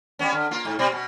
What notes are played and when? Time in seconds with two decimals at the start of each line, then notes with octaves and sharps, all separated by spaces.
0.19 G3 B3 C#4
0.33 D3
0.51 A#3 F4
0.65 G#2
0.79 B2 G3 C4
0.92 B2